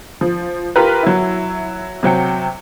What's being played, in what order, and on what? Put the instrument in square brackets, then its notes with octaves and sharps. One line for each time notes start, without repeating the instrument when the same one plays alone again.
[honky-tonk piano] F3
F4 G4 A#4 B4
F#3 E4
C3 F#3 G5 C#7